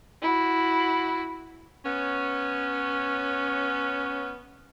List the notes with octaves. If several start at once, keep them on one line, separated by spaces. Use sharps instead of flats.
E4 F#4
B3 C#4